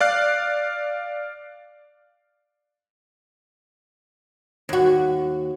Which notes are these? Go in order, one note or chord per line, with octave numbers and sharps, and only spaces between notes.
D5 F5 F#6
D#2 F#4